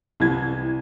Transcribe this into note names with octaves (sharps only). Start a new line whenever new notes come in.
C2 E3 G#6